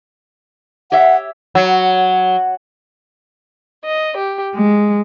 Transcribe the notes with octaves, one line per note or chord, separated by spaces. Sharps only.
G4 C#5 E5 F#5
F#3
D#5
G4
G#3